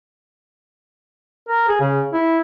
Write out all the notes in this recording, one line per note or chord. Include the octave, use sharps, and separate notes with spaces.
A#4
G#4
C#3
E4